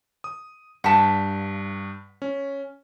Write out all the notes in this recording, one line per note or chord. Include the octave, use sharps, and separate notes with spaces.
D#6
G2 F#5 A5 B6
C#4